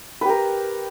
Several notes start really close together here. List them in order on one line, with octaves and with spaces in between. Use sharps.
B4 G4 A#4